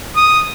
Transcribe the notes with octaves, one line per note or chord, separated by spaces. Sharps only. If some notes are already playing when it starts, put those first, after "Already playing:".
D#6